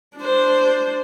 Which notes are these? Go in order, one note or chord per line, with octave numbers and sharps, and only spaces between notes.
D4 C5